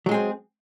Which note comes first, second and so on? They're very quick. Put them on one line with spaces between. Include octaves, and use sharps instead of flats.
F#3 G#3 G#4 C4